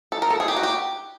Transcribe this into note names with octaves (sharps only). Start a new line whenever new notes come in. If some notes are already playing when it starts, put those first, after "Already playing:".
A4
A#4
A4
G#4
G4
F#4
G4